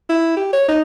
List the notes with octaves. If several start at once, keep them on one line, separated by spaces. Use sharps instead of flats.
E4
G4
C#5
D#4